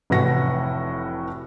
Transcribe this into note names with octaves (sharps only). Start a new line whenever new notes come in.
F1 A2 E3 F#4 A#6